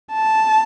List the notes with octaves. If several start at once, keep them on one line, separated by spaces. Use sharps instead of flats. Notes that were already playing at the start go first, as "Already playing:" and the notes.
A5